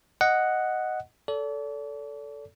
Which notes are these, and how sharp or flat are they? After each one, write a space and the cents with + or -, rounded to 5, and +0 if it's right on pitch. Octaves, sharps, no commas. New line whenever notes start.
D#5 +0 F#5 +0
A4 +0 D5 -40